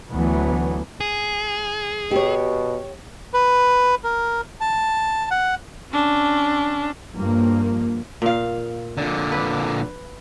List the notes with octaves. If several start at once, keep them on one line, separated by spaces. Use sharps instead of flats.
D2 E3 F#3 A3 B3
G#4
B2 G4 C#5
B4
A#4
A5
F#5
C#4 D4
G2 F3 A#3
A#2 F5
A#2 D3
B4